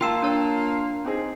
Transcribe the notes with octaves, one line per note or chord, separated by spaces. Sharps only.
A#3 F4 F5 G5 A5 E6
D4 C#5
C4 D#4 G#4